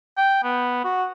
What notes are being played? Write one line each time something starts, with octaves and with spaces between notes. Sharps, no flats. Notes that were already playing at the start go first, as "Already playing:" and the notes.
G5
B3
F#4